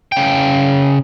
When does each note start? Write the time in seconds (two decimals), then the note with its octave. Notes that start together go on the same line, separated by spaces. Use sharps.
0.12 C#3 G5